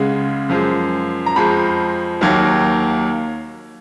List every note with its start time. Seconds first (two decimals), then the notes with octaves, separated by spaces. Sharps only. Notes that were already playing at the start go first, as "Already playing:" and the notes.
Already playing: C#2 C#3 G#3 F#5
0.50 F#2 F3 G#3
1.26 A#5
1.36 F2 F3 G#3 B5
2.21 D#2 D#3 F#3 A#3